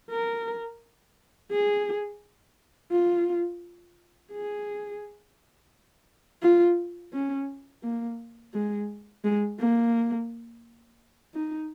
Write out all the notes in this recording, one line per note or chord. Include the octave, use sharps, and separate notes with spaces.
A#4
G#4
F4
G#4
F4
C#4
A#3
G#3
G#3
A#3
D#4